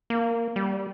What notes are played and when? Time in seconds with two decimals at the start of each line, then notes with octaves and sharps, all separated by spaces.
0.10 A#3
0.56 G3